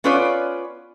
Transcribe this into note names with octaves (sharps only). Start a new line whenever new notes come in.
B3 C#4 F4 B4 C#5 D5